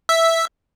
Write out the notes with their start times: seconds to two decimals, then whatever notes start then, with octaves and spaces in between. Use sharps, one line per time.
0.09 E5